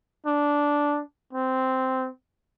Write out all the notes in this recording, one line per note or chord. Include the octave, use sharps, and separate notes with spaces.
D4
C4